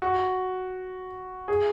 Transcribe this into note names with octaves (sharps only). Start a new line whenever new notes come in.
F#4
G#4